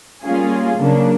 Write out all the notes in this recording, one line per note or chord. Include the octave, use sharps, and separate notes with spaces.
G3 A#3 C#4 F4 G#4
C#3 F#3 A#3 D4